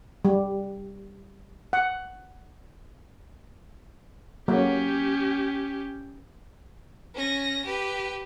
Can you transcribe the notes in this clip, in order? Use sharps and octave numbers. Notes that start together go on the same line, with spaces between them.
G3
F#5
F#3 A#3 C#4 G4
C#4 A#6
G4 B4